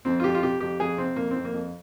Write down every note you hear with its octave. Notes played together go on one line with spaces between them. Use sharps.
F2 C4
F4
F2 G4
F4
C3 G4
F2 G4
F2 G#4
C3 C4
F2 A#3
F2 C4
A#3
F2